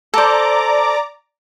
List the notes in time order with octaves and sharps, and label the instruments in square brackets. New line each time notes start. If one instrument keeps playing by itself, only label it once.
[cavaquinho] A4 C5 [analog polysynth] D5 A#5 D6